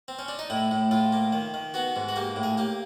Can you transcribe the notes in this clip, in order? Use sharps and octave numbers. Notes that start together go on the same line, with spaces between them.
C4
C#4
D4
D#4
A2 E4
A2
A2 F4
A#3
D#3
D#3
B3 F#4
G#2
F#4
A#3 G4
A2
G#4
A#3 G4